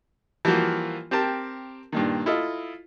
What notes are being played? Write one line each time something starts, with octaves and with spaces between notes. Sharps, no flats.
E3 F3 G3 A#3 F4 F#4
C4 G4 A#4 A5
G2 A#2 D#3
E4 F4 A4 D#5